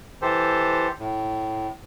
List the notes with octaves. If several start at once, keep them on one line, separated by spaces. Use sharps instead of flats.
E3 G4 A4 C5
A2